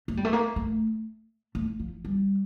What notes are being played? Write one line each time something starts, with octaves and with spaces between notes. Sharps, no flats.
A3
G3
A3
A#3
A3
A3
F3
G3